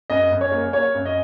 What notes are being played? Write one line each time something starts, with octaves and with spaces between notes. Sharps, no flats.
F#2 D#5
F#2
C#5
A#3
A#3 C#5
F#2
D#5